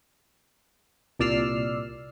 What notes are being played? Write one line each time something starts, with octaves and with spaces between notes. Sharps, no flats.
C2 A#2 D5 E6 F6 C7